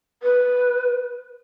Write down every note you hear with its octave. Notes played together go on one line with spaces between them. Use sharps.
B4